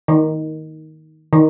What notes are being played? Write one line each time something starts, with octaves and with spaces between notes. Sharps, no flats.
D#3
D#3